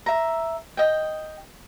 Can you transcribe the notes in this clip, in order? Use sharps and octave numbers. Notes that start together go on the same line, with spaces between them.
E5 A#5
D#5 G5